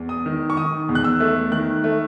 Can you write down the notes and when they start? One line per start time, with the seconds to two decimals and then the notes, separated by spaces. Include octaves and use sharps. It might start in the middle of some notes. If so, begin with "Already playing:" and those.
Already playing: E2
0.09 D#6
0.26 D#3
0.50 C#6
0.57 D#3 D#6
0.89 E2
0.95 F#6
1.04 E6
1.20 A3
1.51 D#3 F#6
1.84 A3